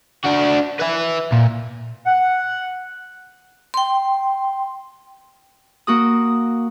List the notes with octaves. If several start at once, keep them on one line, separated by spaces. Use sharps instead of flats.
D4 F#4
B4 E5
A#2
F#5
G5 C6
A#3 F#4 D#6